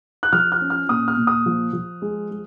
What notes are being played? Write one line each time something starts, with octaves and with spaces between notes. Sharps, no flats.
F#6
F3 F6
F6
C#4
F6
A#2 D#6
F6
A#2
D#6
F3
F3
G#3
G#3